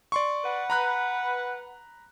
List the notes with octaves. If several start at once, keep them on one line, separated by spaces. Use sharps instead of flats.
D5 C6 C#6
B4 F#5
A#5 B5 F#6